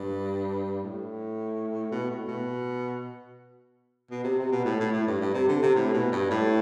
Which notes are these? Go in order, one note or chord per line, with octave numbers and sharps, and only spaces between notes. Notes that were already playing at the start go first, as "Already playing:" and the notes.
Already playing: G2
A2
B2
A2
B2
B2
C3
C3
B2
A2
A2
A2
G2
G2
C3
D3
C3
A2
B2
G2
A2